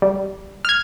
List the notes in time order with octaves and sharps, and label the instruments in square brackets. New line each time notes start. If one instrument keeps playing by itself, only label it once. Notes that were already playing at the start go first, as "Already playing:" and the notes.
[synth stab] G3
F6 G#6